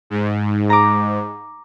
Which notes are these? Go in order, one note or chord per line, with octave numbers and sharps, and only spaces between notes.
G#2
A#5 D6